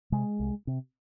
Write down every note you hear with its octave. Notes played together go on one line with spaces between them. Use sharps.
C3 G#3
C2
C3